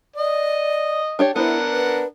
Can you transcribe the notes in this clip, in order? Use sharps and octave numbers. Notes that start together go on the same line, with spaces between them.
D5 D#5
D4 G4 C#5
B3 D4 E4 A#4 C5 F#5
B4